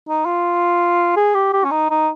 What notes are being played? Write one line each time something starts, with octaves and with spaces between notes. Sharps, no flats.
D#4
F4
G#4
G4
G4
C#4
D#4
D#4